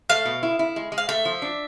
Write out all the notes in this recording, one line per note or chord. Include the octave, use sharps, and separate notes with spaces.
A3 F5
B2
E4
E4
G#3
G#3
F5
A3 E5
F3
D4